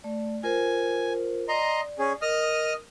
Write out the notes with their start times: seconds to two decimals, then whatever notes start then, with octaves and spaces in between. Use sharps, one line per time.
0.04 A3 D5
0.43 F4 A#4 C5 G#5
1.48 D5 D#5 A#5 C6
1.99 C#4 G#4
2.22 A#4 D#5 D#6 F6